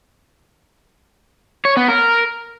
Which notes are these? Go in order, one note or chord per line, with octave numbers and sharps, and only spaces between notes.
C#5
B3
A#4